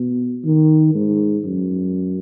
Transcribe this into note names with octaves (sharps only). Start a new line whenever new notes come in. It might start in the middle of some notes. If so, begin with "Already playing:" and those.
Already playing: B2
D#3
G#2
F#2